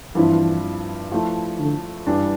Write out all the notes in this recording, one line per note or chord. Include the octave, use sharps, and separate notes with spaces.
G2 E3 F3 C4 E4
F3 A3 E4
D3
G2 E3 G3 D4